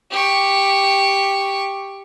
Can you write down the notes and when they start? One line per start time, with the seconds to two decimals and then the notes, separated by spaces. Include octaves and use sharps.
0.11 G4 C#6